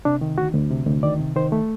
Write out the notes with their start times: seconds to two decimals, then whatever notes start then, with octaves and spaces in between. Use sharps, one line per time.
0.05 C3 D4
0.21 D#3
0.37 D2 F#4
0.54 D2
0.70 C3
0.87 D2
1.03 D#3 D5
1.19 C3
1.36 D#3 C5
1.52 A3